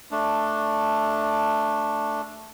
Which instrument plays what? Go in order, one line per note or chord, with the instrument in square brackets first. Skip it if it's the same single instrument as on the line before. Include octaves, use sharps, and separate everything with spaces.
[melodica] A3 D4